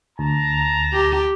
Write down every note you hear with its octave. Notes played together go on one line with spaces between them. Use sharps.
D2 A5 A#5
G4